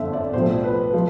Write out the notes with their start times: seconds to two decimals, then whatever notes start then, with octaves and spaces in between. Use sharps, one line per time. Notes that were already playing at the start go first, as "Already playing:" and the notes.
Already playing: G1 F2 D3 E5
0.13 D5
0.33 B1 A2 F3 C5
0.64 B4
0.94 F3